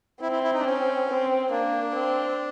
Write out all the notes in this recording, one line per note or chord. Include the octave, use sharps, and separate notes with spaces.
C4 E4
E4
E4
D#4
D4
C#4
C4
A#3 D4
C4